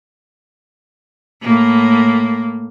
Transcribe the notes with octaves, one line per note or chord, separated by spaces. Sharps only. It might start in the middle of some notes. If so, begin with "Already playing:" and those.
A2 A#3